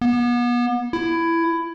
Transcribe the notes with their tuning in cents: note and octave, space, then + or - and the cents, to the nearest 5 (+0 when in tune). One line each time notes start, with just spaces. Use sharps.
B3 -35
E4 +15